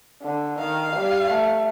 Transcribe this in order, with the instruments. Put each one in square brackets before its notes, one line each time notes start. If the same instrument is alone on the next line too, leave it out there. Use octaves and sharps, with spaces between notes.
[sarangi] D3
[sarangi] D#3 [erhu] F5
[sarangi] G3
A3